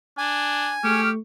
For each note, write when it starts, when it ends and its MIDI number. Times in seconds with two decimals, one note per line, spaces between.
0.18 0.73 62
0.18 1.01 80
0.84 1.18 57
0.84 1.10 67
0.84 1.11 68
0.84 1.11 85
0.84 1.11 89